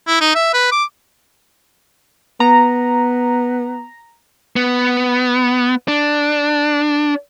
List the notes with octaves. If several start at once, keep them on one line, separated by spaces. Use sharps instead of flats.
E4
D#4
E5
B4
D6
B3 A#5
B3
D4